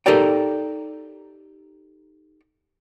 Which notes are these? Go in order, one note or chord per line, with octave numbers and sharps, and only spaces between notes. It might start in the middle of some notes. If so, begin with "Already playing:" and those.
D#4 G4 A4 A#4 D5 G5